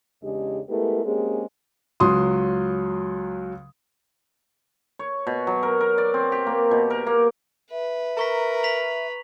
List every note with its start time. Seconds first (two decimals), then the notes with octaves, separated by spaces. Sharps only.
0.23 E2 C#3 G#3 D4 G4
0.69 G#3 A3 B3 E4 G4 A#4
1.04 G#3 A#3 C4 C#4 G4 G#4
2.00 C#2 F#3 C6 D#6
4.99 C#5
5.27 B2
5.47 F#3
5.63 A#4
5.80 A#4
5.98 D5
6.14 C4
6.32 G4
6.47 A#3
6.71 B2
6.90 A#4
7.07 A#3
7.71 B4 E5
8.17 A#4 A#5 C#6 B6
8.63 B6 F7 F#7